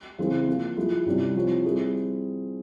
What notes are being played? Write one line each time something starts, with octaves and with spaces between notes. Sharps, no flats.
C#3 E3 G#3 C4 E4
F3 A#3 F4
F3 G#3 E4
C3 G3 C#4 E4
F3 C4 E4 G4 C#5
G3 C4 E4 G#4